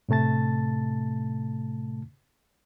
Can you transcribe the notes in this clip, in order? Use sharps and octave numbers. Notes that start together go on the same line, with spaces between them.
A2 C3 A3 A5 A6